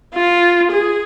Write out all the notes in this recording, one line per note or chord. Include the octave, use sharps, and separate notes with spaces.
F4
G#4